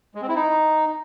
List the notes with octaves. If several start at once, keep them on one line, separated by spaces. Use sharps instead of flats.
G#3
C4
E4
D#4